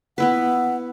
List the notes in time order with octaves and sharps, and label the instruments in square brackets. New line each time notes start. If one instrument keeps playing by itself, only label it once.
[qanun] B3 E4 B4 [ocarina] F#5